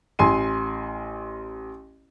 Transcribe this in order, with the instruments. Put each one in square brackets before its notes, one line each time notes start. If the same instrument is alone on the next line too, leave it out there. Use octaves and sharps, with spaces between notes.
[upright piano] A1 G#5 C6 D#7